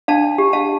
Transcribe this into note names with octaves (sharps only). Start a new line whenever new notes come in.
D4 F5 A5
G4
F5 A5